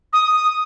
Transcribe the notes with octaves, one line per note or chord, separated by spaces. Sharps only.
D#6
D#6